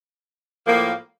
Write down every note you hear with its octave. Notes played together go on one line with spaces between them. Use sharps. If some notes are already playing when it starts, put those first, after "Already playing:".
A2 F3 A#3